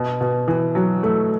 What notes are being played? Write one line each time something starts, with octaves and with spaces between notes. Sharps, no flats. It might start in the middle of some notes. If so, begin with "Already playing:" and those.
Already playing: B2
B2
E3
F#3
A3